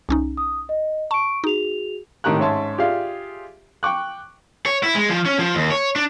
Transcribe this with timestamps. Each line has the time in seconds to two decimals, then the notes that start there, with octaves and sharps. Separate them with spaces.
0.09 C2 C#4 D#4
0.37 D#6
0.69 D#5
1.11 A5 C#6 D7
1.44 D#4 F#4 G#4 F7
2.24 G#1 A2 D#3 G4 A#5 F#6
2.39 G#2 C#4 C#5 E5 A5 C6
2.78 F4 G4 G#4 D5 E5 F5
3.83 G5 C#6 D6 F#6
4.66 C#5
4.83 E4
4.95 G#3
5.09 F3
5.26 C#4
5.39 F3
5.55 D#2
5.71 C#5
5.96 D4